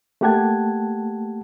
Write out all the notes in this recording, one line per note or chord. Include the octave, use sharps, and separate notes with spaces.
A3 A#3 G4 F#5 A5 G#6